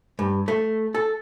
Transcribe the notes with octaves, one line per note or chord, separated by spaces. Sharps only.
G2
A3
A4